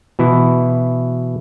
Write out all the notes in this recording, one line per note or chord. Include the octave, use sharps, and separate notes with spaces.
B2 E3 E4